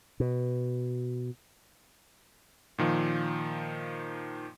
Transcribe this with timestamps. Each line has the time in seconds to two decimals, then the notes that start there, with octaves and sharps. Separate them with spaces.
0.20 B2
2.78 A#2 D#3 F3